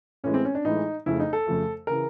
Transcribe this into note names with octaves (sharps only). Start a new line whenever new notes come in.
A2 E3 G#3 C#4
C4
C#4
D4
A2 E3 G#3 D#4
F2 C#3 F3 A3 E4
D#4
A4
F2 C#3 F3 A3
C#3 E3 A#4